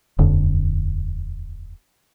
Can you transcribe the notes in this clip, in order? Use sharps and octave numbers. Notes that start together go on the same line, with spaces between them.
D#1 F2 D3